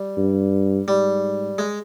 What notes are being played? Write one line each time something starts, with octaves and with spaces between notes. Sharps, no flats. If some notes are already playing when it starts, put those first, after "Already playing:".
Already playing: G3
G2
G#2 G3
G#3